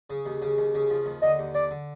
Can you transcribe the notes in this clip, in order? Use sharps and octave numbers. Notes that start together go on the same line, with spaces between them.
C#3
D#2
C#3
D#2
C#3
F3
D#2
D3 D#5
D#2
D3 D5
D3